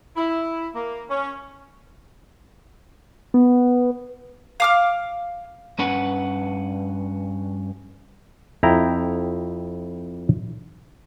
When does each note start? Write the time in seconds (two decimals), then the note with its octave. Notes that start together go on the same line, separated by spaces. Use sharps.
0.16 E4
0.74 A#3
1.09 C#4
3.34 B3
4.60 F5 D6 F6
5.79 G2 C#4 B4 F#5
8.63 F2 E4 D#5 G5 A#5